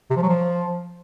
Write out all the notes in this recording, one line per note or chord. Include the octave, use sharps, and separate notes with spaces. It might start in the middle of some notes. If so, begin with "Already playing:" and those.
C3
F3
F#3
F3